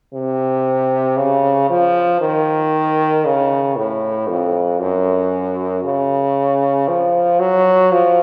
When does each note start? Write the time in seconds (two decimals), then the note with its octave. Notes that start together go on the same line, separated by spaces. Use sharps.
0.14 C3
1.17 C#3
1.70 F3
2.21 D#3
3.25 C#3
3.76 A2
4.29 F2
4.80 F#2
5.84 C#3
6.88 F3
7.39 F#3
7.91 F3